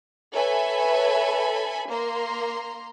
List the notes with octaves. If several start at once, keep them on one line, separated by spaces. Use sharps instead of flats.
A4 B4 C#5 E5 G#5 B5
A#3 A#5 C6